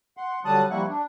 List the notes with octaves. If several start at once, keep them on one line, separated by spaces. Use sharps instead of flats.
F#5 C6
D3 F#3 G3 A5 D#6 F#6
F3 G3 A#3 E4 F#5 C#6
D4